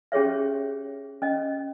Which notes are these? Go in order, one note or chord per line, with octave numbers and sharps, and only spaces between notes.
C#4 G4 G#4 C#5 E5
C#4 D#5